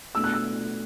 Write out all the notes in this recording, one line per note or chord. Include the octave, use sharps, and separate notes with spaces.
B2 A3 D4 E6
F#6
E6